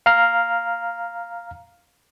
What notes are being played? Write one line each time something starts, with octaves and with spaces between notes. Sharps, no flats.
F5 A#5 F6